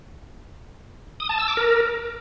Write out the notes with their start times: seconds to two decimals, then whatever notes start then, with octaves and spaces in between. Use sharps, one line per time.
1.20 D#6
1.29 A5
1.39 E6
1.48 D6
1.57 A#4